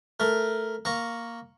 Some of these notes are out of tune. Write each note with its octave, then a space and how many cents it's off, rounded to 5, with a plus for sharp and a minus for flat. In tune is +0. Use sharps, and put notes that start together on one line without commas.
A3 +0 A#4 +0
A#3 +0 A#5 +0 C#6 +0